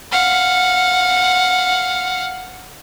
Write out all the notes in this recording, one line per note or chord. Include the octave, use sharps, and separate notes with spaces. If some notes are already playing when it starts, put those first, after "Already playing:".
F5 F#5